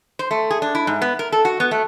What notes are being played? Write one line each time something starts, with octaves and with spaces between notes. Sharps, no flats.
C5
A3
G#4
D4
E4
G#2
B3
A#4
A4
F#4
B3
A3